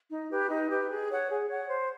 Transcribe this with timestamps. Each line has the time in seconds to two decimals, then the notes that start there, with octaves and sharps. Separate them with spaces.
0.12 D#4
0.31 G4 B4
0.50 D#4
0.70 G4 B4
0.89 G#4
1.09 C#5 F#5
1.29 G#4
1.48 C#5 F#5
1.67 C5